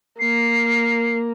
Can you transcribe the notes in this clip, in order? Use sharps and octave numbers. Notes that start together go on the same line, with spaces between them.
A#3 C7